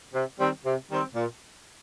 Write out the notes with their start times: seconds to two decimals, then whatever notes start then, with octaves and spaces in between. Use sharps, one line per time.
0.14 C3
0.39 D#3 G3 C4
0.65 C3
0.91 D#3 G3 C4
1.15 A#2